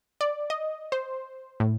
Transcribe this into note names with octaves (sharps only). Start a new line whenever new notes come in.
D5
D#5
C5
A2